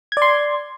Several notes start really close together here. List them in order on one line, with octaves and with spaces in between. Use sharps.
G#6 D5 C6